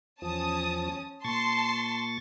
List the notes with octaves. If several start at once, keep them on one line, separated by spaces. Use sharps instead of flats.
E2 F3 C#4 A5 D#6
A#2 A5 C6 C#6 A6